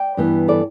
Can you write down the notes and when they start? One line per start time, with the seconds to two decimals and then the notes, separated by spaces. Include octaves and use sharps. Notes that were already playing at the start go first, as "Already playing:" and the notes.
Already playing: D5 G5
0.17 G2 E3 B3
0.48 A4 D5